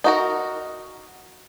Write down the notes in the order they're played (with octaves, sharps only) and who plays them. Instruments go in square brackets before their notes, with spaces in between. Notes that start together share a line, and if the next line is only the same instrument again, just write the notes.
[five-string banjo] D#4 F#4 A#4